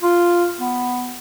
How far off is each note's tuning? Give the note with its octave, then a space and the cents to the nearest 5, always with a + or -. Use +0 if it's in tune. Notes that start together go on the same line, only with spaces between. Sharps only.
F4 -5
B3 +5